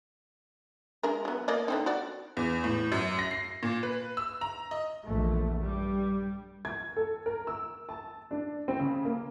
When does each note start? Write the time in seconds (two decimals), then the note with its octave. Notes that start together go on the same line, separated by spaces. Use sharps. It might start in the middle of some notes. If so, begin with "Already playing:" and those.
1.03 G#3 D4 A#4
1.25 F#3 B3
1.48 A#3 D5 D#5
1.68 D3 C4 D#4
1.86 F#4 D5
2.37 E2
2.64 A2
2.92 F#2
3.19 A#6
3.31 C7
3.63 A#2
3.83 B4
4.17 E6
4.41 A#5
4.71 D#5
5.05 A#1 E2 A3
5.61 G2 G3
6.65 G#6
6.97 A4
7.26 A#4
7.47 E6
7.89 A5
8.31 D4
8.68 C4
8.80 C#3
9.05 A#3